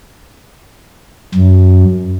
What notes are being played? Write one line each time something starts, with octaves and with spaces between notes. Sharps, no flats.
F#2